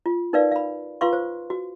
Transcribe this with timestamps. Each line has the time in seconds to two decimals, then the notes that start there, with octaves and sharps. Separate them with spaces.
0.06 F4
0.33 D#4 A#4 B4 D5 F5
0.51 F5 B5
1.01 F4 B4 F5 C6 C#6
1.13 C5
1.50 F#4